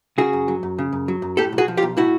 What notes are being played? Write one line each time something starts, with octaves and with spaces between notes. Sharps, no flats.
C#3 F#4 G#4
F#2
F#3
F#2
C#3
F#2
F#3
F#2
A2 G4 A4
B1
F#4 G#4
F3
F4 G4
B1
A2 E4 F#4